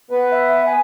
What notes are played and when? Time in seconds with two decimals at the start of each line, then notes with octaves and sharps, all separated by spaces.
0.11 B3 B4
0.32 E5
0.66 G#5